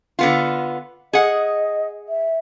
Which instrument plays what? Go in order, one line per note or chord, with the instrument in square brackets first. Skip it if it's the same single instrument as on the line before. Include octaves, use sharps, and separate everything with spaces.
[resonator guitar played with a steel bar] D3 B3 F4
[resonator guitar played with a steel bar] G#4 F#5 [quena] D#5
[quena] E5